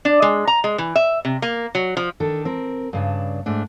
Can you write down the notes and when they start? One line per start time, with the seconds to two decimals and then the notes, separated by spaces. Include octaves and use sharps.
0.05 D4
0.22 G#3
0.47 A#5
0.64 G#3
0.78 E3
0.96 E5
1.25 C3
1.42 A#3
1.75 F#3
1.97 F3
2.20 D#3 D4 A4
2.45 C4 A#4
2.93 G2 C#3 D4
3.46 G#2 A3 D4